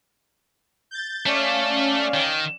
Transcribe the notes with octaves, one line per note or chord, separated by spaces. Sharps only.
G6 A6
A3 C#4 D5 F5
D#3